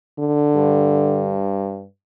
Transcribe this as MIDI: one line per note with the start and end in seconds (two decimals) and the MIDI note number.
0.19 1.39 50
0.56 1.85 43